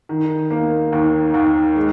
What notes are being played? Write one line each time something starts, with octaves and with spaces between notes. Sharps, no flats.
D#3
A#3
D#2
D#2
G#3